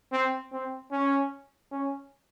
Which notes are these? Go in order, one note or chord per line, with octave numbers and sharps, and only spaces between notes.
C4
C4
C#4
C#4